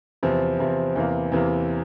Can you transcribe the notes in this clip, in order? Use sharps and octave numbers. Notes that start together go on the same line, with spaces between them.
E2 C3 F3
E2 C3 F3
E2 C3 E3 A#3
E2 C3 E3 A#3